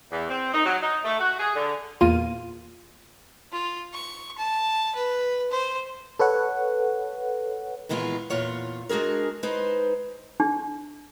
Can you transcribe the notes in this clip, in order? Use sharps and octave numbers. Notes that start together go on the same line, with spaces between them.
E2
C4
D#4
F#3
D#4
A3
F#4
G#4
D3
E2 A#2 A#3 F4 D#7
F4
C#6
A5
B4
C5
A4 B4 C#5 F#5
A#2 D#3 E3 G#3 B3 F4
E2 A#2 F4 C#5 F#5
G#3 D4 F#4 G#4 A#4
G#3 D#4 B4 C5
D4